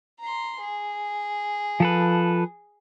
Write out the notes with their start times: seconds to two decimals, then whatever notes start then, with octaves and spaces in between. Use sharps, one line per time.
0.20 A#5 C6
0.60 G#4
1.80 F3 A4 B4